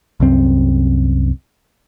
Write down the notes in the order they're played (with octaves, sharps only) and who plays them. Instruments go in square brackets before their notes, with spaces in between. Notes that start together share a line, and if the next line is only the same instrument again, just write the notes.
[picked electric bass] C2 F#2 C4